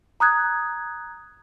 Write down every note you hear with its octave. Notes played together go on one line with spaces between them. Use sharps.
A#5 D#6 F#6 G#6